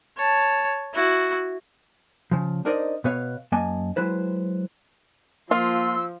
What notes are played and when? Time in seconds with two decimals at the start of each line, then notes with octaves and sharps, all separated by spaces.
0.17 C#5 A5
0.94 E4 F#4
2.31 C#3 F3
2.65 D4 D#4 A#4 C5 D5 D#5
3.04 B2 B3 B4 C#5 F5
3.52 F#2 A#3 D#5 G#5 A5
3.96 F#3 G#3 E4 B4 C5
5.51 F3 A#3 F4 C6 E6